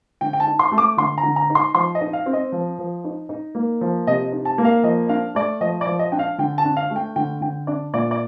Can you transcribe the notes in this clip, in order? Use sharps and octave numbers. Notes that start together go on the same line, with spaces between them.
D3 G5
G5
A5
D#4
C6
A3
D6
D3 C6
A#5
D3
A#5
D#4
C6
F3 C6
D#5
D#4
F5
C4
D#5
F3
F3
D#4
D#4
A#3
F3
C3 D#5
D#4
A5
A#3
F5
F3 D#5
D4 F5
A3 D5
F3 D#5
D5
F3
D#5
D4 G5
F5
D3 G5
A5
D4
F5
A3
G5
D3 G5
D3 G5
D4 D5
A#2 D5
D5